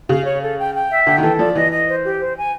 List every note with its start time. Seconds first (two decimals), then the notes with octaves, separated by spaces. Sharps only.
0.09 C#3 F5
0.26 C#5
0.42 A4
0.58 G5
0.74 G5
0.91 E5
1.06 D3 G5
1.18 D#3
1.23 E3 A4
1.39 F3 D5
1.55 E3 D#5
1.71 D#5
1.87 C5
2.04 G4
2.20 C5
2.37 G#5